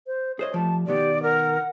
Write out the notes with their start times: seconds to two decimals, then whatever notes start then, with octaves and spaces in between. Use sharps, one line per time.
0.07 C5
0.39 G#4 C5 C#5 D#5
0.54 F3 G3 A3 A5
0.87 B2 D#3 B3 G4 D5
1.23 A#4 F#5